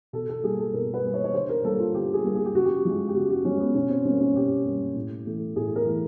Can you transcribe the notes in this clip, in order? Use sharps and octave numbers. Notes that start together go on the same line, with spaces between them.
B2 A4
A4
G3 A#3 G#4
A4
B2 A#4
B4
G3 A#3
C#5
C#5
D3 C5
A#4
G3 A#3 A4
F4
D3 G4
G#4
G3 A#3
G#4
G4
C#3 F#4
G4
F3 G#3
G4
C#3 F#4
F#4
F3 G#3 C#4
B3
B2 C#4
C4
G3 A#3 C#4
C#4
B2 G4
G3 A#3
A2
E3 A3
A2 G#4
A#4
E3 A3